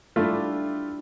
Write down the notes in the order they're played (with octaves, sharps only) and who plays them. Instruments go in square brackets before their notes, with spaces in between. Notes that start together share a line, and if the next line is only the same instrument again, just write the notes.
[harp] G3 D4 E4 [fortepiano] A3 F4